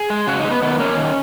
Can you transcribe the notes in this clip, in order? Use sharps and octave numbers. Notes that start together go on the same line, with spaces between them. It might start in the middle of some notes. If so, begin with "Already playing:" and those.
Already playing: G#4
G#3
C#3 F#4
D#4
G#3
B3
D#3 B3
A#3 C#4
D#3